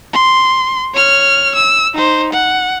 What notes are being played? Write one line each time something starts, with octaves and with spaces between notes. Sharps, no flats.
C6
C#5 F6
E6
D#4 C5
F#5